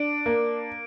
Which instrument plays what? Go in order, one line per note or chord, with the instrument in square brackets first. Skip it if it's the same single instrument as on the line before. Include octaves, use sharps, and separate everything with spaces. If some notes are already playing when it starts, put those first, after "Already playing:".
Already playing: [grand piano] D4 [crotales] D7
[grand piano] A#3